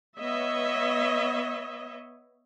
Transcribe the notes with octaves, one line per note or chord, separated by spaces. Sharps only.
B3 C#5 D#5 E5